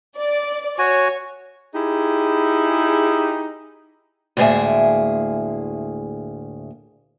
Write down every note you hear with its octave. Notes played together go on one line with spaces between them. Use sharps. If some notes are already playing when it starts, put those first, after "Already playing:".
D5
F#4 C#5 G#5
D#4 E4 G4 G#4
D2 A2 G#3 A#3 G#4 E5